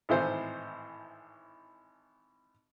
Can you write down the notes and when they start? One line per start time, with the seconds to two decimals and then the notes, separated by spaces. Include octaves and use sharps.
0.09 G#1 A2 E3 C5